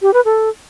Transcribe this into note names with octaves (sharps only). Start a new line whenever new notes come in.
G4
B4
A4